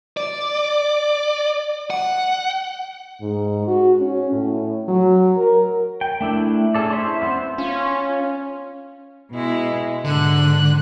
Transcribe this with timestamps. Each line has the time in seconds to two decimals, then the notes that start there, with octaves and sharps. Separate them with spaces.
0.17 D5
1.90 F#5
3.21 G#2
3.67 F#4
4.00 C#4
4.32 A2
4.88 F#3
5.37 A#4
6.01 G5
6.21 A3 D4 E4
6.75 C#4 G#4 A4 D5
6.90 C#4 E4 C5 E5
7.22 B3 C4 C5
7.58 C#4 F4
9.31 B2 G#3 E4
10.05 G#2 D3 F#6